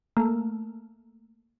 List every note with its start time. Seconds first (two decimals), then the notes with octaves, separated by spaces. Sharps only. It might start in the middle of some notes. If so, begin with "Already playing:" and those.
0.17 A3 A#3